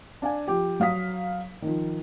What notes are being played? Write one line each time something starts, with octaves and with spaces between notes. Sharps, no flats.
D4 F5 G#5
F3 G4
F#3 F5 D#6 B6
D#3 F3